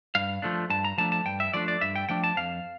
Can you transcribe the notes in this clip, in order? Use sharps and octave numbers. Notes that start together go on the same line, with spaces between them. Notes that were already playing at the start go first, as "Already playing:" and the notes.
G2 F5
F3 A3 D4
G2 A5
A#5
F3 A3 D4 A5
A5
G2 G5
E5
F3 A3 D4 D5
D5
G2 E5
G5
F3 A3 D4 G5
A5
F2 F5